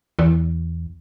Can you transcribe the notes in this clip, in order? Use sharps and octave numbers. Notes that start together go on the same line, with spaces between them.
E2